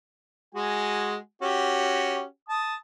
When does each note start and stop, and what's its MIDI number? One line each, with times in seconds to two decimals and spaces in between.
0.55 1.17 56
0.55 1.17 66
0.55 1.17 80
1.42 2.23 61
1.42 2.23 66
1.42 2.23 67
2.49 2.75 81
2.49 2.75 87